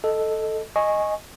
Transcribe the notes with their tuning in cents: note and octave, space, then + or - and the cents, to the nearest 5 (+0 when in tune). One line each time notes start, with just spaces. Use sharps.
A4 +0 D#5 +0
D#5 +0 G#5 +0 C#6 -15